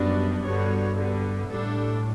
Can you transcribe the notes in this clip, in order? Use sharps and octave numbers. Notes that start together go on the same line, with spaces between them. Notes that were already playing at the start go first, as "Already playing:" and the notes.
Already playing: F#2 G3 B3 D4 F#4
G2 D3 G3 B3 F#4 C#5
D3 G3 B3
A2 G3 D4 A4